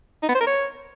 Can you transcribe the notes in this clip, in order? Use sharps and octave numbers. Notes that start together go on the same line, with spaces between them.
D#4
B3
C5
A#4
C#5